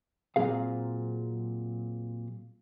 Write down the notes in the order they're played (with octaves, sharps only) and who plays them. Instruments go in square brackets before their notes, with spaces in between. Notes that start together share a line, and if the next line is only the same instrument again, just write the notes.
[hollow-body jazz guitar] A#2 F#3 C4 G#4 F5